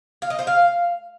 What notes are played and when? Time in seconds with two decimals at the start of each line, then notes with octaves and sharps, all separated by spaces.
0.22 F5
0.30 D#5
0.39 C5
0.47 F5